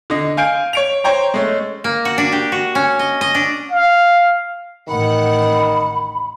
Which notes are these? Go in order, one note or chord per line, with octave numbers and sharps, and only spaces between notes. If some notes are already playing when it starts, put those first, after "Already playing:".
D3 D#5
F5 G#5 G6 D7
C#5 D7 F7
C5 C#5 G5 A#5
G#3 A3 C#4
A#3
F#4
D4
G4
F#4
C#4
D#5
D#5
D4
F5
A1 D#3 F#5 B5